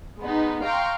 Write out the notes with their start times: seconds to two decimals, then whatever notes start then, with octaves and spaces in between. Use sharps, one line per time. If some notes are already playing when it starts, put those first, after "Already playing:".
0.21 G#3 B3 D#4
0.63 F5 G5 A#5 C6 C#6